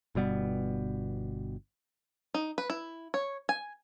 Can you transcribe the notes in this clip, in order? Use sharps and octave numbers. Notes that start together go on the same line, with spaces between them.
G1 B2 G3 B3
D#4
B4
E4
C#5
G#5